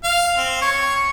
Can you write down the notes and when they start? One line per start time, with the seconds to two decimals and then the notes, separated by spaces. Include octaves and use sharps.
0.04 F5
0.38 C4
0.62 C#5